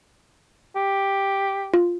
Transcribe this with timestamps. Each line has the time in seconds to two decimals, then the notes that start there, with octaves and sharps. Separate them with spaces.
0.76 G4
1.74 F4